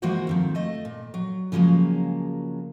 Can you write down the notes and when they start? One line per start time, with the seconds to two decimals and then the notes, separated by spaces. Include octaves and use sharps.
0.02 E3 G#3 A#3 F#4 C5 F#5
0.27 F2 D#3 F3
0.55 A3 D#5
0.85 A#2
1.14 F#3
1.52 C#3 F3 F#3 G#3 A#3